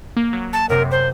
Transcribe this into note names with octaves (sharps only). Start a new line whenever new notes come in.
A#3
F#3
A5
F#2 C3 A#4
C5